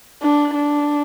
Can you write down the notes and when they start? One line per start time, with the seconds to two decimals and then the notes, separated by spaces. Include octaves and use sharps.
0.22 D4
0.55 D4